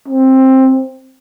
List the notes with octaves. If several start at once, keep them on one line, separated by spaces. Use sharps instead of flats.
C4